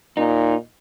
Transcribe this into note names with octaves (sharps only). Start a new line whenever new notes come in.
A#2 D#4